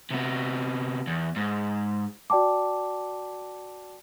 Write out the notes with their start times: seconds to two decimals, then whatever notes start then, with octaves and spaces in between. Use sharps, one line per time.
0.10 C3 B3
1.07 E2
1.36 G#2
2.30 F#4 D5 G5 A5 D6